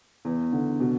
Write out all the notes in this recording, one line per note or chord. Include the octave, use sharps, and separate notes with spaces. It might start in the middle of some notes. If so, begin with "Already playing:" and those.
E2
D3
B2